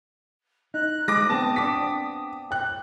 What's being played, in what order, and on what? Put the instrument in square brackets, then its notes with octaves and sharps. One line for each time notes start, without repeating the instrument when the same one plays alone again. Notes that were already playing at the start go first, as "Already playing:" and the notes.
[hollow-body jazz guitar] D#4 [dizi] F#6
[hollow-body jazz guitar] G#3 [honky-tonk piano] D6 A#6 [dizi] D#6
[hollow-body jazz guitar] B3 C4 [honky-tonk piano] A5
[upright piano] D4 D6 B6
G5 F#6